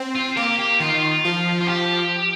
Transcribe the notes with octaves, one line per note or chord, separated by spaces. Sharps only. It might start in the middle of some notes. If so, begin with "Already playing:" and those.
Already playing: C4
F4
A#3 G4
G4
D#3 F4
F3
F4
G4